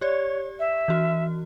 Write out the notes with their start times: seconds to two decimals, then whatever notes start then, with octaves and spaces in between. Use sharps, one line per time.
0.01 G4 C#5 D5
0.60 E5
0.88 E3 F#4